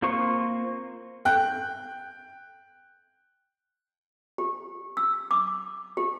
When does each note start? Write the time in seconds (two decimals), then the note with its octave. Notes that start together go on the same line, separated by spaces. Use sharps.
0.02 A#3 C4 F4 C5 C#6
1.25 G5 F#6
4.38 G4
4.97 E6
5.31 D6
5.97 G4